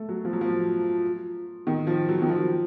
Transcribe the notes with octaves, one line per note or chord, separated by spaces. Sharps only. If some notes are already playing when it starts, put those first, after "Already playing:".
Already playing: A3
F#3
F3
F#3
F3
D#3
F3
F#3
D#3
F3